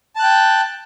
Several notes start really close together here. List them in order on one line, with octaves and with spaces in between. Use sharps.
A5 F#6 G5